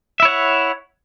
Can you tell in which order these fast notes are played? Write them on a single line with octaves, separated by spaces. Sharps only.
E5 E4 C#5 F#5